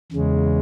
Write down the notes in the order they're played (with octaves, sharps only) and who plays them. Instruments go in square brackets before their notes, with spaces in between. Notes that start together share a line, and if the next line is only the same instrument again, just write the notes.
[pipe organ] E2 C#3 G#3